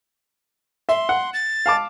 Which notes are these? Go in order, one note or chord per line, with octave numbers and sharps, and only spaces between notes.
E5 C6
F#5
A6
F5 A5 D6